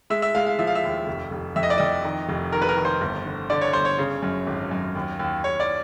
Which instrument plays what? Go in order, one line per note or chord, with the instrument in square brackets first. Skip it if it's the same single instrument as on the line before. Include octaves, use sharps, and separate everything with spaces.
[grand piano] G#3 E5
E5
G#3 F5
F5
F3 E5
F5
E5
D#2
F1
F1
F2 E5
D#5
D5
F2 D#5
D#3
F1
D#3 A#4
B4
A#4
D#3
C5
G1
D3
D3 D5
C#5
G1 C5
C#5
C#3
F#2
G#1
F#2
D#2
D#2
D#2 C#5
D5